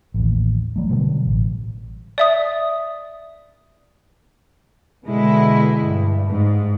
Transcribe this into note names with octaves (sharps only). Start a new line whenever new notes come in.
A1 D#2
F#3 A3
B2 D3 F#3 G3
A1
D5 E5 D#6
B2 D3 G#3 E4
G2
G#2